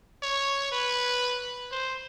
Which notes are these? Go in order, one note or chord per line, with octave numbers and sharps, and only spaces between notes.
C#5
B4
C5